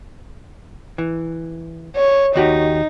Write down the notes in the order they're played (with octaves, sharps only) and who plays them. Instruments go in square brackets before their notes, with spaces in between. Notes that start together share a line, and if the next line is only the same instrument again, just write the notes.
[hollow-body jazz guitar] E3
[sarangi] C#5
[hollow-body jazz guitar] D#2 F#4 G4 [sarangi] D#4